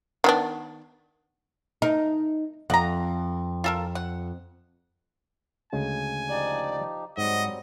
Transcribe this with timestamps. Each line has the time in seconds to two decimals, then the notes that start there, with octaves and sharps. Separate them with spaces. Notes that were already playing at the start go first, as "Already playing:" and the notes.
0.24 D#3 B3 D4
1.82 D#4 A#4
2.70 F2 F#5 A#5
3.64 F4 A4 A#4
3.95 F#5
5.73 D2 C#3 G#3 G#5
6.29 F3 D#4 G4 D5
7.18 G#2 F#3 G3 C4 D#5 F#5